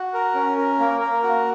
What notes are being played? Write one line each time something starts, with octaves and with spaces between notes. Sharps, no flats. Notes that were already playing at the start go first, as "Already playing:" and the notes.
Already playing: F#4
A#4
C#4
A#4
A#3
A#4
F#4